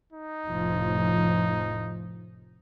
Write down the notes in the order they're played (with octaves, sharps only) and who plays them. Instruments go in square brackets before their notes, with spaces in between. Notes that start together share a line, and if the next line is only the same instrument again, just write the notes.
[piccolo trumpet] D#4
[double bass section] F1 A2 F3